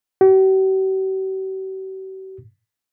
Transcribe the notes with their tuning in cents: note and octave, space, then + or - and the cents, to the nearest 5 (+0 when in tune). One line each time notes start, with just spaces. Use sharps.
G4 -45